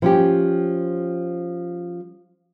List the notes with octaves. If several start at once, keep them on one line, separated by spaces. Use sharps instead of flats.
F3 C#4 G4